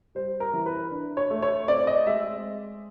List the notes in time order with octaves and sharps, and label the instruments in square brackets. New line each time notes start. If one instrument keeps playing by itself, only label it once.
[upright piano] G3 C5
A#4
E3
B4
D4
C#5
A3
C#5
C4 D5
D#5
G#3 E5